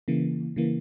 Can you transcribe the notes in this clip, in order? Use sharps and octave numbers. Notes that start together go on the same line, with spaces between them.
C#3 E3 A#3
C#3 E3 A#3